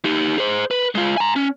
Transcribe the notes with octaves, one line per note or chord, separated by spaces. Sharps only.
D#4 G4
G#4 C5
B4
G#3 F4
G#5 A#5
C#4